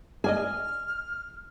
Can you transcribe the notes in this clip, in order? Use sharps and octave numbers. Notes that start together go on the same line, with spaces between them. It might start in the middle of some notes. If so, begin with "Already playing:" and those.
G#4 D5 D#5 G#5 F6